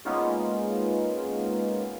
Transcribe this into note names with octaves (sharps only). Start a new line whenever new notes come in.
G#3 A#3 B3 C#4 D#4 F4